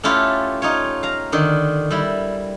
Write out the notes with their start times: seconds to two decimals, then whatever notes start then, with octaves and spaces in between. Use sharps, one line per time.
0.03 A3 C#4 E4 F4 G4
0.62 D#4 F4 C#5
1.03 F5 A#5
1.32 D3 D#3
1.91 G3 E4